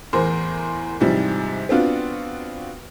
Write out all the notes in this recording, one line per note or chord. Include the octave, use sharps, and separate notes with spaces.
E2 A2 A#4 C5
G#2 C3 E3 F3 G3
B3 C4 D4 F4 F#4